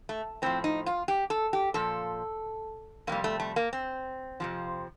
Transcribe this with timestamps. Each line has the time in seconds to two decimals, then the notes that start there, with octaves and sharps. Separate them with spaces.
0.09 A3
0.42 A2 F3 C4
0.64 D#4
0.86 F4
1.08 G4
1.30 A4
1.53 G4
1.74 A#2 F3 A4
3.07 F2 C3 G3 A#3
3.24 A3
3.40 A3
3.56 A#3
3.73 C4
4.40 F2 C3 F3